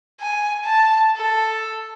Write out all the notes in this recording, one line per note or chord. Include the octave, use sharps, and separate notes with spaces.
G#5
A5
A4